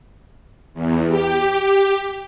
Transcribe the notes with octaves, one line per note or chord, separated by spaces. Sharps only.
E2
G4